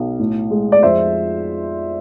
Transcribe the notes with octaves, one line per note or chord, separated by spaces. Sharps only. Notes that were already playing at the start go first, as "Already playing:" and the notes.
Already playing: B1
A2
G#3
D5
F2 C5 E5